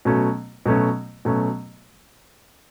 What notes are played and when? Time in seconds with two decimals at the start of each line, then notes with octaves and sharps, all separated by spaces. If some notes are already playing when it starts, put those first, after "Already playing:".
0.05 B2 F#3 A3 C#4
0.66 B2 F#3 A3 C#4
1.25 B2 F#3 A3 C#4